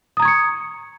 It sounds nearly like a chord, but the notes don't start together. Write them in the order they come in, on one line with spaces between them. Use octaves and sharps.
D#6 A#5 G#6 C#6 C#7